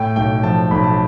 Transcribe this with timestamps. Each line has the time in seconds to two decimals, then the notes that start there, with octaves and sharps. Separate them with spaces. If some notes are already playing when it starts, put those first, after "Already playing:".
Already playing: A2 G5
0.16 B1 G5
0.43 F3 A5
0.71 B1 B5
0.84 A5